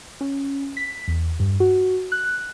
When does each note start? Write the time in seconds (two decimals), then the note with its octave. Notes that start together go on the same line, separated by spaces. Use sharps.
0.21 C#4
0.77 B6
1.08 E2
1.39 G2
1.60 F#4
2.12 F#6